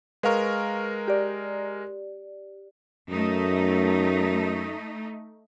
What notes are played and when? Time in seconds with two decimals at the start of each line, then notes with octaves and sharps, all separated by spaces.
0.23 G#3 A#4 B4 F5 C#6
1.08 G4 D5
3.09 F#2 A3 D#4